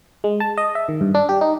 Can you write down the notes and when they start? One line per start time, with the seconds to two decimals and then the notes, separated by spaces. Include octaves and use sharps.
0.24 G#3
0.40 A5
0.57 D#5
0.75 E5
0.89 D#3
1.01 G2
1.15 D4
1.29 G4
1.41 D#4